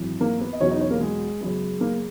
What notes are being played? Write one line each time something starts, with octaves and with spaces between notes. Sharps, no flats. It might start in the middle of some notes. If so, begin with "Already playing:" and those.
Already playing: G#1 F#2 E3
A#3 A#4
B3 B4
D#5
E2 B2 F#3 B3 C#4 C#5
D#4 D#5
C#4 C#5
A#3 A#4
G#3 G#4
F#2 C#3 G#3 B3
A#3 A#4